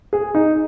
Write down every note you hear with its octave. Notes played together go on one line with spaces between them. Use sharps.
G#4
D#4